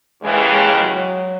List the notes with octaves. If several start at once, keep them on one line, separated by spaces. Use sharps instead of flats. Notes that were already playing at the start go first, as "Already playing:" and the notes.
D#2 C#3 E3 G#3
G#3
F#3